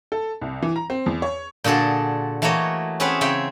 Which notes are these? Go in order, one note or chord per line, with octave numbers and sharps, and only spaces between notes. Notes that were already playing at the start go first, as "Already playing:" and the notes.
A4
C2
E3
A#5
C4
E2
C#5
A#2 D3 F#4 G#4 A4
E3 A3 A#3 F#4 C#5 D#5
C4 C#4 G#4 B4 E5 F#5
C#3 C4 C#5 E5 G5